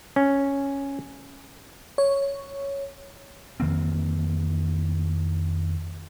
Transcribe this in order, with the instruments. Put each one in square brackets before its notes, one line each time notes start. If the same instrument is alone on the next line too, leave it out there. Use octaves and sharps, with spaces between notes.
[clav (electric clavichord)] C#4
[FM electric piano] C#5
[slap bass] F2 D#3 A#3 C4